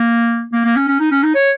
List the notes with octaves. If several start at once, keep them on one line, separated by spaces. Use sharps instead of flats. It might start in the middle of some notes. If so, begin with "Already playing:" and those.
Already playing: A#3
A#3
A#3
C#4
C#4
D#4
C#4
D#4
C#5